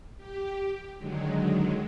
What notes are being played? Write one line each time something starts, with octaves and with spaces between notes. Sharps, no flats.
G4
D3 D#3 F#3 G#3